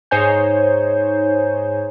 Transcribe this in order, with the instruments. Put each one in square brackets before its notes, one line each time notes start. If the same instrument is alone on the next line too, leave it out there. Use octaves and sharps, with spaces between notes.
[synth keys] G#2 D#4 C5 C#5 G#5 G6